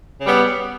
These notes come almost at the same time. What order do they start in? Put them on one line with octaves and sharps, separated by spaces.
C#3 G3 B3